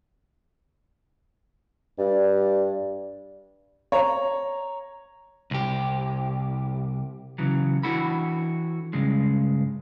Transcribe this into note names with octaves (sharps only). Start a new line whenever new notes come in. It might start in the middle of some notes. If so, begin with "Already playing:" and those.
G2 D5
C#5 A#5
C2 G4
C#3 E3 F#3
E3 D4 E4 F#4 A4 B5
G2 C#3 G#3